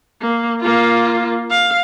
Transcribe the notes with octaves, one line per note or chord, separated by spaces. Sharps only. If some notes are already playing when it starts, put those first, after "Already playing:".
A#3
A#3 F4
F5